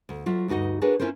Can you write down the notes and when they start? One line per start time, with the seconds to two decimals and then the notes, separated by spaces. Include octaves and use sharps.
0.09 D2
0.26 F#3 F4 E5
0.48 D2 G2 D#4 F#4 D#5
0.81 D4 F#4 G#4 A#4 B4 C#5
1.00 C#4 E4 F4 A#4 C5